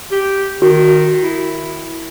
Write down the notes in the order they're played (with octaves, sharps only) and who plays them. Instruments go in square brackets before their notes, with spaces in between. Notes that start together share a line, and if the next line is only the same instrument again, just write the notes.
[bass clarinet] G4
[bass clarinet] D#3 [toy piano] F#4
[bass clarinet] E4